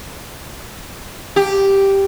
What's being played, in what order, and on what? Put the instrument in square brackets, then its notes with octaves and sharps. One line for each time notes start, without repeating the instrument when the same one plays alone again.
[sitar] G4